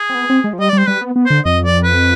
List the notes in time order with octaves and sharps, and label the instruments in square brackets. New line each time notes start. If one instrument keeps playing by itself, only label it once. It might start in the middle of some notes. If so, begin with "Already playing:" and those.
Already playing: [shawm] G#4
[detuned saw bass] C4
B3
C4
G#3
F3
[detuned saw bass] G3 [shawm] D#5
[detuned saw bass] G3 [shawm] D5
[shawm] C5
[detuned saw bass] G3 [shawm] B4
[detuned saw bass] B3
B3
[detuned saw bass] D3 [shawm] C5
[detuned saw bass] F2 [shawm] D#5
[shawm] D5
B4